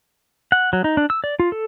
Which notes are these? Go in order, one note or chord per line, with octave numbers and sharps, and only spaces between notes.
F#5
F#3
D#4
D4
E6
D5
F4
A4